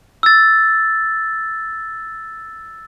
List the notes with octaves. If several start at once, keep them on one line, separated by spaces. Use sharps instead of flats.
E6 A6